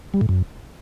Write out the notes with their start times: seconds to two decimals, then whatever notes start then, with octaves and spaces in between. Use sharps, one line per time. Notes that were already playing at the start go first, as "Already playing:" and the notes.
0.14 G3
0.21 A2
0.29 F#2